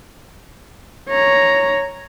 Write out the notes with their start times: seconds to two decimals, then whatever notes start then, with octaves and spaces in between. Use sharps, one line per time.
1.09 C#5 A#5